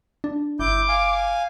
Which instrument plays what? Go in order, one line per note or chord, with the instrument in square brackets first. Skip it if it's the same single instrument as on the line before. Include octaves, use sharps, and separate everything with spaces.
[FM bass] D4
[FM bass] G1 [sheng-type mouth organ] E4 G6 [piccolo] D6
[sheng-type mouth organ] F5 G#5